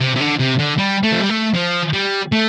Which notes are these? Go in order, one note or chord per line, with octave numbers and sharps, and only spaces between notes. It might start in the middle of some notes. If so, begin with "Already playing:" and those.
C3
C3
D3
C3
D3
G3
A3
F3
G3
A3
F3
G3
A3